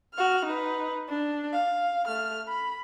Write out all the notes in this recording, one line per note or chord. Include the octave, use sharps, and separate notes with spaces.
F#4 F6
D#4 B4
D4
F5
A3 F6
B5